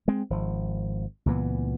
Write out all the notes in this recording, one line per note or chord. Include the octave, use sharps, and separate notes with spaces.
G#3 C4
G#1 F3
C#2 A#2 E3 B3